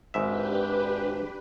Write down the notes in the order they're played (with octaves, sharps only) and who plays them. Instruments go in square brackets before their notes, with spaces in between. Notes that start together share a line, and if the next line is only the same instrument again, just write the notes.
[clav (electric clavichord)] G#1 G#2 E5 [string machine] D4 G4 B4